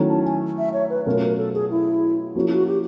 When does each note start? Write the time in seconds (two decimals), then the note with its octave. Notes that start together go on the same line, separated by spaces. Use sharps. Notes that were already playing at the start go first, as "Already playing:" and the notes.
Already playing: D#3 F#3 A3 C#4 E4
0.09 A5
0.25 G#5
0.58 E5
0.73 C#5
0.90 B4
1.06 B2 F#3 A3 C#4 F4 A#4
1.23 A#4
1.38 A4
1.54 G#4
1.71 E4
2.35 F3 A#3 C#4 E4 F#4 G#4
2.52 F#4
2.67 G4